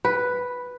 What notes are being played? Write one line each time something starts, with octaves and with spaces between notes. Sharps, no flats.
B4